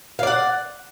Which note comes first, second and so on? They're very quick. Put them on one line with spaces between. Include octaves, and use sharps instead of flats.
F5 D5 F#5